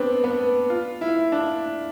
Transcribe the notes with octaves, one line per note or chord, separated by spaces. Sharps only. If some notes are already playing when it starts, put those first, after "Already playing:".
Already playing: B3 C4 D4
B3
F4
E4
D4